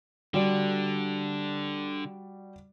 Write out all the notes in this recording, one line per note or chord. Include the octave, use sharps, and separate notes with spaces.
D3 G3 F#4 D5